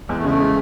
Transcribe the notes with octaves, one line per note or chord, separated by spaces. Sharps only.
E2 G#3
A3
C#3 G#3 A3
G#3